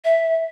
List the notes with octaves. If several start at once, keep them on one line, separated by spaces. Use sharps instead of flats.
E5